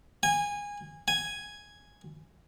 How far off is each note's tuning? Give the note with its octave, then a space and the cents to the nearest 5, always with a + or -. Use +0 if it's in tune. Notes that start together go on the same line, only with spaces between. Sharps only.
G#5 -20
G#5 +0